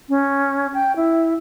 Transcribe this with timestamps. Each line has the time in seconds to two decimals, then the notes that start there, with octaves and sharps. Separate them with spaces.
0.09 C#4
0.74 G5
0.96 E4